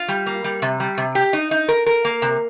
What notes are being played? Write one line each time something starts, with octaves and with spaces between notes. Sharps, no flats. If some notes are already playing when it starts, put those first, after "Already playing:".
Already playing: F4
G3
A#3
G3
C3
G3
C3
G4
D#4
D#4
A#4
A#4
A#3
C3